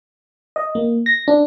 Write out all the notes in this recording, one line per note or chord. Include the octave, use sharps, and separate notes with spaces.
D#5
A#3
A#6
D4